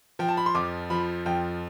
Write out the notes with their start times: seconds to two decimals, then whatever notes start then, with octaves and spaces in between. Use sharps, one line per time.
0.19 F3 G5
0.28 A5
0.37 B5
0.46 C6
0.55 F2 D6
0.90 F3 B5
1.26 F2 G5